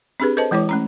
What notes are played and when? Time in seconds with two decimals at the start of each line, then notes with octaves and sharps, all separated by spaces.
0.20 C4 D4 G4 G#4 B4
0.37 A4 B4 C5 D#5 A5
0.51 E3 G#3 E4 C#5 D6
0.69 A3 C#4 A#5